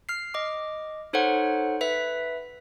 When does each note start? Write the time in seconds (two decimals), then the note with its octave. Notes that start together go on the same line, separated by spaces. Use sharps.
0.09 F6 C7
0.34 D#5 D6
1.13 D#4 A4 C5 C#5 F#5
1.81 B4 E5 B6